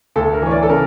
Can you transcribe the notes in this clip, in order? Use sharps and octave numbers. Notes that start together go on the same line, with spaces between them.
D2 A4
A#4
E3 C#5
D5
A4
C#3 A#4